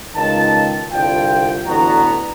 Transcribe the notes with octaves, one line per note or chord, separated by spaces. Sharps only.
C#2 D#3 F4 A5
C2 D3 F4 G5
A1 D3 E3 B3 F#4 A#5